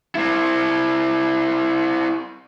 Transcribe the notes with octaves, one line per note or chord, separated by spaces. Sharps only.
C4 E4